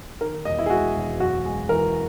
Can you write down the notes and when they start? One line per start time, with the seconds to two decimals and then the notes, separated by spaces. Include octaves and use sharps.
0.21 D#3 A#4
0.45 E1 D#5
0.59 E4
0.66 G#4
0.70 G#3 F#4
0.96 E1
1.20 F#2 F#4
1.45 G#3
1.69 E3 A#4